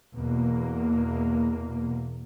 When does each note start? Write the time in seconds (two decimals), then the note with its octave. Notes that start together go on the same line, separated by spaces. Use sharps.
0.16 E2 B2 A#3